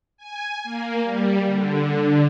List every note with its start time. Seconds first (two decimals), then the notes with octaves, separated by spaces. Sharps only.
0.17 G#5
0.64 A#3
1.03 G3
1.46 D3